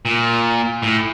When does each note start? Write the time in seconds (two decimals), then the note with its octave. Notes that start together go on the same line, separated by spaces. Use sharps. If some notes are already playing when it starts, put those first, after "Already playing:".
0.05 A#2
0.83 A2